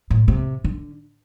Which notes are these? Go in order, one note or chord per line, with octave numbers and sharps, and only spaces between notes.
A2
C3
D3